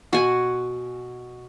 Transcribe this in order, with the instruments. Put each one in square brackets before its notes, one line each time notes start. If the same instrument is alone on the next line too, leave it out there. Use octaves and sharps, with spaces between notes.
[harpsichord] B2 [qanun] F#4 G#5